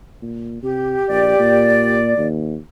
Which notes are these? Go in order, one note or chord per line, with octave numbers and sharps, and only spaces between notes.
A#2
C3 G4
A#1 D5
A#2
D#2